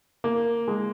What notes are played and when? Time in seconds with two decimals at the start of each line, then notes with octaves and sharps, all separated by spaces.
0.24 A#3
0.68 G#3